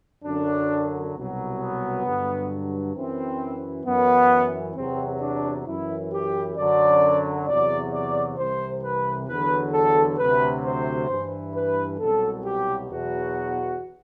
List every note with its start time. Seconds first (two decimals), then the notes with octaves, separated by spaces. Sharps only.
0.24 F#2 D3 F#3 D4
1.15 C2 B2 F#3
1.60 B3
2.05 G2 D3 F#3
2.95 F#2 E3 C4
3.86 F#2 E3 B3
4.76 E2 C3 F#3 C4
5.21 D4
5.67 F#2 E3 E4
6.12 G4
6.57 F#2 D3 F#3 D5
7.48 E2 C3 F#3 D5
7.93 D5
8.38 C2 C3 E3 C5
8.84 B4
9.28 E2 D3 F#3 B4
9.73 A4
10.18 D2 C3 F#3 B4
10.64 C5
11.09 G2 E3
11.55 B4
11.99 C2 B2 F#3 A4
12.44 G4
12.90 E2 B2 F#3 F#4